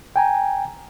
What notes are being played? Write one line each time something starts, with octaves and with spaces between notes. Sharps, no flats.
G5 G#5 A#5